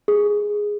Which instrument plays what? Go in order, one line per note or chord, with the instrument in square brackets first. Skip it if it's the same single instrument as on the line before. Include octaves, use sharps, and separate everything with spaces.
[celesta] G#4